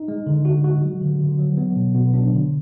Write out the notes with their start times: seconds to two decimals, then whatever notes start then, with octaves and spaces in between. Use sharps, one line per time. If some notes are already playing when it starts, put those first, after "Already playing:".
Already playing: D#4
0.08 G#3
0.27 D3
0.45 D3 F#4
0.64 G#3 F#4
0.83 F#3
1.02 D3
1.20 D3
1.39 F#3
1.57 F#3 B3
1.76 B2
1.95 B2 B3
2.14 F#3 D4
2.32 D3